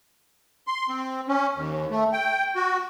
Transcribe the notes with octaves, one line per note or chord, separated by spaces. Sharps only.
C6
C4
C#4
D#2
A3
G5
F#4